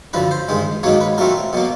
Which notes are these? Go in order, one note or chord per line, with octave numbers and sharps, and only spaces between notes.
F#2 D3 F3 B4
C5
G2 D#3 G#3
G#2 D#3 F#3 A#3 C#5
B4
A#2 F#3 A3 C4 A#4
B2 F#3 A#3